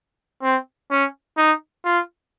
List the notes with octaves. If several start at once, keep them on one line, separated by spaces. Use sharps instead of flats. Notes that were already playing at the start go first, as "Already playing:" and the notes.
C4
C#4
D#4
F4